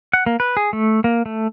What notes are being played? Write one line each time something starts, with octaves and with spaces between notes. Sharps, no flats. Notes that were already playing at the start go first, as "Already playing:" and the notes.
F#5
A#3
B4
G#4
A3
A#3
A3